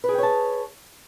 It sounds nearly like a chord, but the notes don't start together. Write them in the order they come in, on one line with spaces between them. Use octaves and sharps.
B4 G#4 G5 C#5 A5